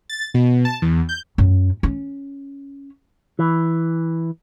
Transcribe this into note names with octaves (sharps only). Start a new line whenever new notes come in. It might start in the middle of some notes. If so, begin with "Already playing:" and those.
A6
B2
A5
E2
G6
F#2
C#4
E3